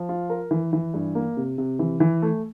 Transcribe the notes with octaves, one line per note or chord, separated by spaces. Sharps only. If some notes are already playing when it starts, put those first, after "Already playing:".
Already playing: F3
F4
A#4
E3
E3
G2
A#3
C3
C3
E3
E3
A3